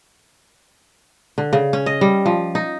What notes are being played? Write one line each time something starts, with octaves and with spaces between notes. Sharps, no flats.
D3
C#3
C#4
D#5
G3
F3
D#4